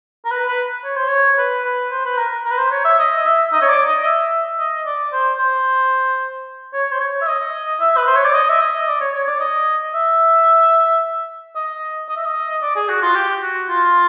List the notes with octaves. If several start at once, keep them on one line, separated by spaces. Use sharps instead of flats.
A#4
B4
B4
C#5
C5
C#5
B4
B4
C5
B4
A#4
A#4
B4
C5
C#5
E5
D#5
E5
D#5
C#5
D5
D#5
E5
D#5
D5
C5
C5
C#5
C5
C#5
E5
D#5
E5
B4
C5
C#5
D5
D#5
E5
D#5
D5
C#5
C#5
D5
D#5
E5
D#5
D#5
E5
D#5
D5
G#4
F#4
F4
G4
F#4
F4